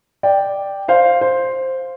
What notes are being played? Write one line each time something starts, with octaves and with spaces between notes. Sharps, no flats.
D5 G5
C5 F5
C5